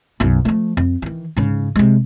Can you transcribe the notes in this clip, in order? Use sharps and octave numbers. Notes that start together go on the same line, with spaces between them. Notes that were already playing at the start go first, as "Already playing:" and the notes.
B1 F#2
F3 A3
F2
D#3 E3
G#2 C#3
C3 G#3